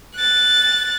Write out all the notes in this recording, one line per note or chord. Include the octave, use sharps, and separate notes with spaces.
F#6 A6